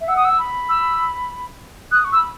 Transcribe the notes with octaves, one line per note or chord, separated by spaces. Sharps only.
E5
F#5 E6
D#6
E6
B5
E6
D#6 F#6
C#6
E6
B5